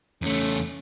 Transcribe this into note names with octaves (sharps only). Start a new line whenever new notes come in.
E2 A3 C#4